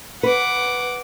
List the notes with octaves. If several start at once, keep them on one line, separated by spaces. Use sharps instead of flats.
B4 F#5 D6